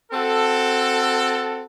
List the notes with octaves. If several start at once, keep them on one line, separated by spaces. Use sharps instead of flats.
C4 F#4 A4